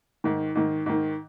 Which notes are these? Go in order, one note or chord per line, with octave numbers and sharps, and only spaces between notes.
G#2 D#3
G#2 D#3
G#2 D#3